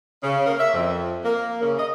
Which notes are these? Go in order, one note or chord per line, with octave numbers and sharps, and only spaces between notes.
C#3
A#3
E5
F2
A#3
C#3
D#5